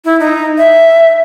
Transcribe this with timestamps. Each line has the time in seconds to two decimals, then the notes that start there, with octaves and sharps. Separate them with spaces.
0.05 E4
0.20 D#4
0.58 E5